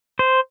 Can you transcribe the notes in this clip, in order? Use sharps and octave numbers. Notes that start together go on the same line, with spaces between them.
C5